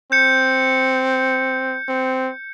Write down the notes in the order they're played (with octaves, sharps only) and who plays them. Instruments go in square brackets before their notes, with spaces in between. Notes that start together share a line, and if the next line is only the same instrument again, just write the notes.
[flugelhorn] C4 [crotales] G6 C#7
[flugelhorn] C4